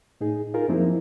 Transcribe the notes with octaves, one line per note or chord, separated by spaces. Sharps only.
A2 D#4 G#4
D#4 F4 G#4 A#4
F#2 F3 A#3 C4 D#4 E4